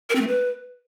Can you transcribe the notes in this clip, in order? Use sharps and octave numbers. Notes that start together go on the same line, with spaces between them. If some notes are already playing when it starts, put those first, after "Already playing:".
A#4
C4
A3
B4